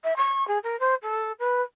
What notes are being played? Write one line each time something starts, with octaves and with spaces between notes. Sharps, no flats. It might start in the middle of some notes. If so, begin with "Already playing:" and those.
E5
C#6
G#4
A#4
C5
A4
B4